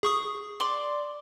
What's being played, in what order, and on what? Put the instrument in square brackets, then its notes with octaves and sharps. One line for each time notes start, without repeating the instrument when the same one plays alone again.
[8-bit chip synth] G#4 C#6 D#6
[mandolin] D5 C6 D6